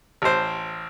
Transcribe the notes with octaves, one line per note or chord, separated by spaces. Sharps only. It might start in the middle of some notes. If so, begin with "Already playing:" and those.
A1 C5